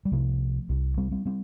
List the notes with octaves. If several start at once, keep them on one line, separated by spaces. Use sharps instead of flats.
G3
C2 C3 F3 A3
C2 C3
G3 C4
G3 C4
G3 C4